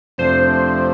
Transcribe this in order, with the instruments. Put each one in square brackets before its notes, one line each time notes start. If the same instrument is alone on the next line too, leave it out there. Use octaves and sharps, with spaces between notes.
[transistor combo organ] F2 C3 F3 A3 D4 [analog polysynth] C5